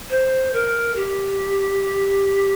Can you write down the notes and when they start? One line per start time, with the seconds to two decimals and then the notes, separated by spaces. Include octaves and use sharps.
0.10 C5
0.53 A#4
0.96 G4